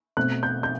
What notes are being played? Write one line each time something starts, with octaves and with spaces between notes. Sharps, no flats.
B2 A3 C4 F#6
G6
G6